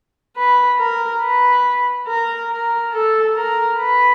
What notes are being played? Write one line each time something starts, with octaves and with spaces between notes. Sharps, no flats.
B4
A#4
B4
A#4
A#4
A4
A#4
B4